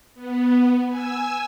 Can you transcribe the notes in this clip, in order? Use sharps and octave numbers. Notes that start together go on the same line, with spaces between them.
B3
G#5 E6